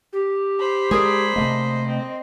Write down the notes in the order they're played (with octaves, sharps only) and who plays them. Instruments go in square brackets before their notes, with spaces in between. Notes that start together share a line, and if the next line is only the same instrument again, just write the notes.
[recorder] G4
[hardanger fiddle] C5 B5
[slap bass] G#3 [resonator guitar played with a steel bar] G#4 A#4 D5
[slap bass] C3 A3 A#3 [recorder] D#5
[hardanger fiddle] C4